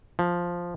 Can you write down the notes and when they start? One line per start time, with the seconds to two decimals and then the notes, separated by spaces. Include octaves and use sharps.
0.19 F3